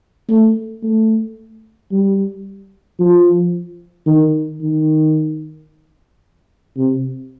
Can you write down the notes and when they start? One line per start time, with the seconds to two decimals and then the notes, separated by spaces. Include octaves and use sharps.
0.29 A3
0.83 A3
1.92 G3
3.00 F3
4.07 D#3
4.61 D#3
6.77 C3